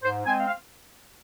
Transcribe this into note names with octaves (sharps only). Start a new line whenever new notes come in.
G#2 C5
G#3 C4 G#5
F5
F5